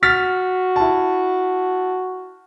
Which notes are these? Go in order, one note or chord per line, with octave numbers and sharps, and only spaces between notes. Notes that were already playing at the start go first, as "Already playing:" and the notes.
F#4 F6 A6 B6
E4 A5